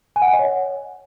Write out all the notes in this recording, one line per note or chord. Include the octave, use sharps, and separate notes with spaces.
G#5
F#5
G#5
D#5
C#5